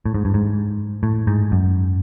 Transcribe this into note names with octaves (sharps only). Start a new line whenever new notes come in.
A2
G#2
G2
G#2
A2
G#2
F#2